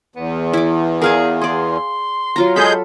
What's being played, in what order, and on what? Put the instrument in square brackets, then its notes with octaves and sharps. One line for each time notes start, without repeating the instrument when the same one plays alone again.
[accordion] E2 [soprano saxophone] B3
[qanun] E4 D6
[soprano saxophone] G#4 [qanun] A#4 F5 G#5
[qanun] G#4 D5 [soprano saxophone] C6
[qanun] F#3 F4 A#5
[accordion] G#3 G#4 G6 [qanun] A4 B5